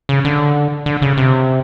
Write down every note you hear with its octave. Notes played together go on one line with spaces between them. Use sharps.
C#3
D3
D3
C#3
C3